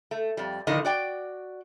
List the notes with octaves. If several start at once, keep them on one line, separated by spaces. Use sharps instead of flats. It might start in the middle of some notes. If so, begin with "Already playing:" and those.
A3
F2 G3
A2 D3 D#3 F3 D#5
F#4 D5 G5